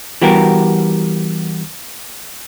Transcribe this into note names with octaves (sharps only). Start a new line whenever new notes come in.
E3 G3 B3 F#4 G4 A#4